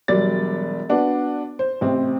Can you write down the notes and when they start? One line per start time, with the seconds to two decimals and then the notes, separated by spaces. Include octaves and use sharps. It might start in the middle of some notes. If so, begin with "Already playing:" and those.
0.08 E1 F#3 G3 D5 A6
0.89 B3 D4 F#4
1.59 C5
1.81 A1 C3 C4